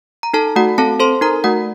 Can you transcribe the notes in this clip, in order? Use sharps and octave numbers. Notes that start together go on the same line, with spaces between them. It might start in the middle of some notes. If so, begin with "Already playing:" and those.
A#5
D#4 A4 A5
A3 F#4 F#5
C4 A4 A5
A4 C5 C6
D#4 A#4 A#5
A3 F#4 F#5